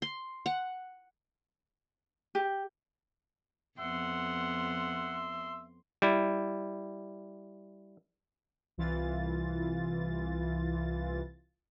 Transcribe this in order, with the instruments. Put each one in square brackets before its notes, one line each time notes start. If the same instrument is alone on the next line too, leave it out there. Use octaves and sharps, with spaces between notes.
[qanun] C6
F#5
[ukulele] G4
[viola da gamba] F2 B3 [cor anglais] E5 [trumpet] F#5 [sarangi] C6
[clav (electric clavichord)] G3 E4
[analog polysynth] C2 E3 F4 A6